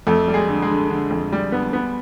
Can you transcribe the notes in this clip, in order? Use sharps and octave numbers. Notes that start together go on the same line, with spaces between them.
F2 A3 A4
G3
G#3 G#4
D3
G#3 G#4
D3
D3
F2
G3
B3
B3